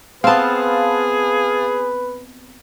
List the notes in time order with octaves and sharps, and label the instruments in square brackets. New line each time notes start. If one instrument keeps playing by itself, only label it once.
[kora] B3 C4 [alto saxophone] G#4 [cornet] B4 [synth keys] F5 A5